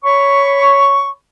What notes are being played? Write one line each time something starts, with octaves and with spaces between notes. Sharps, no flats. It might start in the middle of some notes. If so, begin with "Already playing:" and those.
C#5 B5 C#6